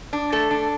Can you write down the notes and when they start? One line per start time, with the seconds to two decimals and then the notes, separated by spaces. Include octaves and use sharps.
0.13 D4
0.32 A3 A4
0.51 D4